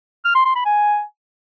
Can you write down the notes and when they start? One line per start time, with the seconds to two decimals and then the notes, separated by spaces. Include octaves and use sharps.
0.25 F6
0.35 C6
0.45 C6
0.55 B5
0.66 G#5